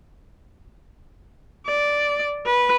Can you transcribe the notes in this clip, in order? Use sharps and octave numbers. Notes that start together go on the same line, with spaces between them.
D5
B4